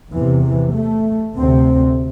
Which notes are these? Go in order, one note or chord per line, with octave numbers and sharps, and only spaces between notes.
E2 C3 E3
E3
A3
D2 C3 C4